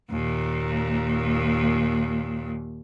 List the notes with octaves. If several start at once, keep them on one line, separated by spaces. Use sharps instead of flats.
D#2 A#2